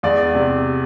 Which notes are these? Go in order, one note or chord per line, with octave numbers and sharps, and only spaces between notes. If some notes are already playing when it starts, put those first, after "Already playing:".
E2 D5
C3